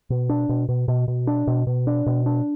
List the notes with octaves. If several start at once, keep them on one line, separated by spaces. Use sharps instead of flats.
B2
D4
B2
B2
B2
B2
D4
B2
B2
D4
B2
D4